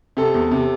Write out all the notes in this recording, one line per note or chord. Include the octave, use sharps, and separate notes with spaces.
C3 A4
E2
C3